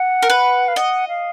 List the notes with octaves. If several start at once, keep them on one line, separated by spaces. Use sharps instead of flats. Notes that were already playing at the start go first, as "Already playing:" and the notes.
Already playing: F#5
A#4
B4
F5
D#5 F#5
F5